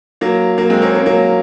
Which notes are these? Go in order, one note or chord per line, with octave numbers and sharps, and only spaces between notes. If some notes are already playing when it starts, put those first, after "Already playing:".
F#3 A#3
F#3 A#3
G#3 C4
A#3 C#4
A#3 C#4
F#3 A#3